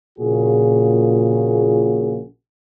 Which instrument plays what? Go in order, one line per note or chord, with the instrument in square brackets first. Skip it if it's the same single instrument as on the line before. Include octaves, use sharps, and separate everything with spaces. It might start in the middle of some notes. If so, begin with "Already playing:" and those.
[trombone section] A#1 A#2 C#3 F#4 G#4